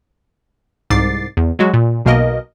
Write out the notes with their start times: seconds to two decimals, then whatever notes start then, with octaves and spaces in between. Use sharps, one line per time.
0.90 C2 G#2 D6 A6 C7
1.37 E2
1.59 F#3 G#3 F#4
1.74 A#2
2.05 B1 B2 A#3 A#4 D#5